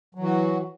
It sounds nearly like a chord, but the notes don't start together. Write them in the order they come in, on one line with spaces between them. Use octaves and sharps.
F#3 E3 F#4